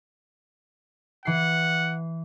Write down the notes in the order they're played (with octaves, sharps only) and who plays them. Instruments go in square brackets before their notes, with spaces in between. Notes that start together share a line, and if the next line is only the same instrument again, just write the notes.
[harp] E3 C7 [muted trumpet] F#5